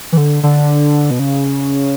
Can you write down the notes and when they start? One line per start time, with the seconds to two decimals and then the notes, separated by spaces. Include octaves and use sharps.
0.12 E3
0.17 D3
0.43 D3
1.11 B2
1.19 C#3